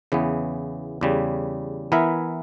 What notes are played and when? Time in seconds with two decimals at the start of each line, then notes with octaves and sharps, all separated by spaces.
0.12 E2 C#3 E3 B3
1.01 E2 C#3 G3
1.92 E3 B3 E4 A#4 E5